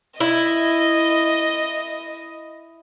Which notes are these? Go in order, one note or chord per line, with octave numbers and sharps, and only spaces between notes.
E4 D#5